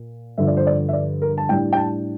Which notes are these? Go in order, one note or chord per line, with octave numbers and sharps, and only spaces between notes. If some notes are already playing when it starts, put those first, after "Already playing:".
Already playing: A#2
G2 D3 F3 E5
D5
C5
D5
E5
D5
A#4
A5
A2 G3 D4 G5
G5
A5